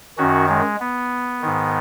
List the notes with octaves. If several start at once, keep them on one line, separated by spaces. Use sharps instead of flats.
F#2 D#3 C#4 F#4
G#3
B3
G#2 D#3